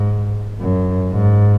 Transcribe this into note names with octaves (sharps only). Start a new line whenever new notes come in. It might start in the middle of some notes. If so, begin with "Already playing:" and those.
Already playing: G#2
F#2
G#2